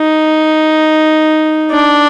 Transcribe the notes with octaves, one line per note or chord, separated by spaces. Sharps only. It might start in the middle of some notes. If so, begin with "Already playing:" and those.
Already playing: D#4
D4